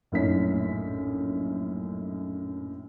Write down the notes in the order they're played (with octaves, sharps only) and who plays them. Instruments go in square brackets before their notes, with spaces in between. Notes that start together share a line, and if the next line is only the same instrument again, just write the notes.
[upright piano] A#1 F#2 A2 D#4 C#5 B6